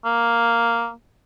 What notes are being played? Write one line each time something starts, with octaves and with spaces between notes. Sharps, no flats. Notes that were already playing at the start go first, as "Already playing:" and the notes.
A#3